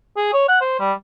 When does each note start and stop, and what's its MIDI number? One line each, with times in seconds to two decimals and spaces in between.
0.17 0.29 68
0.33 0.45 73
0.48 0.60 78
0.61 0.76 72
0.80 0.93 55